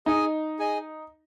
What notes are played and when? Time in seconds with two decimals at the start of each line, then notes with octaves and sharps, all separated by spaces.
0.06 D#4 G#4 D#5 G#5
0.59 G#4 D#5 G#5